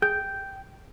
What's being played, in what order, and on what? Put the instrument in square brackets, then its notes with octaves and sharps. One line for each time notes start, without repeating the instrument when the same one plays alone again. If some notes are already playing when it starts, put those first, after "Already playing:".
[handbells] G#4 G6 [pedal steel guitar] G5